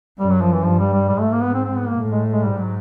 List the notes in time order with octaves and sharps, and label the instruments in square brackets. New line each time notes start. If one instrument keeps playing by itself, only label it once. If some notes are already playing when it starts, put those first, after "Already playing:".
[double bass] F#2 [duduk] G3
[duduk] F#3
F3
E3
[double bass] G2 [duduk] F3
[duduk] G3
G3
[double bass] G#2 [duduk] G3
[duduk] A3
A#3
B3
C4
C4
B3
A#3
[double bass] A2
[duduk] G#3
G#3
[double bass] G#2 [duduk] G3
[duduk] F#3